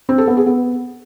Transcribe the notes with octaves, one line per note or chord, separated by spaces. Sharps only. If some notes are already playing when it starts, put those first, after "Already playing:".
C4
A4
B3
G#4
B3